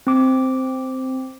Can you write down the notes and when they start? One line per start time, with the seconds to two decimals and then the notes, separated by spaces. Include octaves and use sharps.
0.07 C4 D6